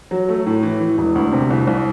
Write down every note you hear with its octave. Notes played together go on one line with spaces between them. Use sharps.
F#3
A3
A2
E3
E3
E1
D2
C3
C2
C2